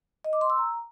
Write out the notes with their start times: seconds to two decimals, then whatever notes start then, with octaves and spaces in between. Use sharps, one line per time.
0.24 D#5
0.33 D6
0.41 C6
0.50 E6
0.58 A#5